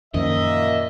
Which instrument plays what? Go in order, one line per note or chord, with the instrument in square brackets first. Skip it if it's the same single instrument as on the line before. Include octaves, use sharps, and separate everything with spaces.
[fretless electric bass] F#2 F3 [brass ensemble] A#2 A#3 E5 [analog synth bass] D#3 [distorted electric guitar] D#5